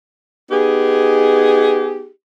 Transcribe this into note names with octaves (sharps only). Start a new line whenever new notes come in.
B3 D#4 G4 G#4